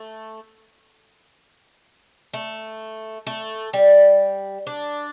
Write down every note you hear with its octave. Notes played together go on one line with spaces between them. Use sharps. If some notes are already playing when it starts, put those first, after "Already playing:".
Already playing: A3
A3
A3
G3
D4